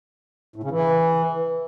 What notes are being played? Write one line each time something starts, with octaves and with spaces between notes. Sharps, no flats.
A2
C#3
E3